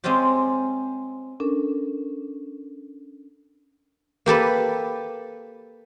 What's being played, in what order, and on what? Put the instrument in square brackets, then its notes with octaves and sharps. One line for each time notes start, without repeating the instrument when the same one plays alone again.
[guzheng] G#3 C4 C#4 F4 G4
[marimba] C#4 D4 A4 A#4
[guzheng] A#3 G4 A4 B4